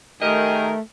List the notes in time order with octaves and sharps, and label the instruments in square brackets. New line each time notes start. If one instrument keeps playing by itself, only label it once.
[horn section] D#3 G4 G#4 [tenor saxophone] A3 [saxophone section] A#4 [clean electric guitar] D#5